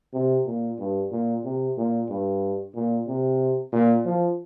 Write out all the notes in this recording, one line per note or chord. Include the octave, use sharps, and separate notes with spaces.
C3
A#2
G2
A#2
C3
A#2
G2
A#2
C3
A#2
F3